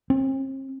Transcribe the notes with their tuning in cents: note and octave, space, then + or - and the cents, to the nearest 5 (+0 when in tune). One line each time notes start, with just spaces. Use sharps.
C4 +45